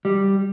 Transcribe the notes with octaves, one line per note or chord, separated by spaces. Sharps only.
G3